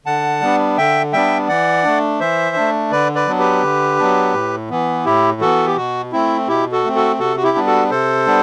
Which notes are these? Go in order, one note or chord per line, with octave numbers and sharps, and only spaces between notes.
D3 F#5 A5
G3 B3 D4
D3 E5 G5
G3 B3 D4 E5 G5
E3 D5 F#5
A3 D4
E3 C5 E5
A3 D4
D3 B4 D5
B4 D5
F#3 B3 D4
G4 B4
D3
F#3 B3 D4
A2
E3 B3
A2 E4 G4
E3 B3 F#4 A4
G4
B2 F#4
A3 C4 E4
B2 E4 G4
F#4 A4
A3 C4
F#4 A4
C3 F#4 A4
F#4
E4 G4
G3 B3 D4
F#4 A4
C3 A4 C5
G3 B3 D4